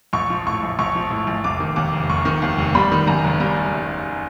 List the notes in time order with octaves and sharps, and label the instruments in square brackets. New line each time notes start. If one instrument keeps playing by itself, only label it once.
[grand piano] A#1 [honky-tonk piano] C#6
[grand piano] F3
[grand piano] A2 [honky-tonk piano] C#6
[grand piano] A#1
[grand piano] A#1 [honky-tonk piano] C#6
[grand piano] F3
A2
A#1
[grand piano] F1 [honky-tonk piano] D6
[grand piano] D#3
[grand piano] D#2 [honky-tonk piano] D6
[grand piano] F1
[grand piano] F1 [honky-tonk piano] C#6
[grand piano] D#3
D#2
F1
[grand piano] G3 [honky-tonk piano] B5
[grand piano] D#3
[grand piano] F#2 [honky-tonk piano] A#5
[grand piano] F#1
[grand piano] G3 [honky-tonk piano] A#5